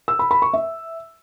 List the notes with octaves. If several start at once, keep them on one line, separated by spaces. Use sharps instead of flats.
E6
B5
B5
C#6
E5